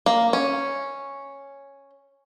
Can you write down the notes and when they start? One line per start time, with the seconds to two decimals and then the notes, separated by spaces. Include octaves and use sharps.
0.06 A#3
0.33 C#4